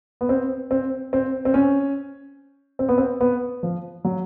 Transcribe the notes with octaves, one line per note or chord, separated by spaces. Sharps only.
B3
C4
C4
C4
C4
C#4
C4
B3
C4
B3
F3
F#3